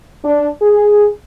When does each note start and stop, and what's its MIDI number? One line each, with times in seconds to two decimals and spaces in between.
0.24 0.48 62
0.62 1.07 68